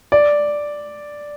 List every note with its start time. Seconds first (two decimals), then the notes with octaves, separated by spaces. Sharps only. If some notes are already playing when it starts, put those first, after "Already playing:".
0.12 D5